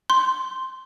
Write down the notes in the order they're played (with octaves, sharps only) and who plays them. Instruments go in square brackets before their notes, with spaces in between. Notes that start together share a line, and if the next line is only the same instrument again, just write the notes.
[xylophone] C6